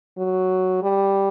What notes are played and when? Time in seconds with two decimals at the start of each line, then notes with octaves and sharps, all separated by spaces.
0.18 F#3
0.83 G3